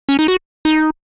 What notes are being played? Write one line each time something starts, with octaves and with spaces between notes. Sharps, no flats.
C#4
D#4
F#4
D#4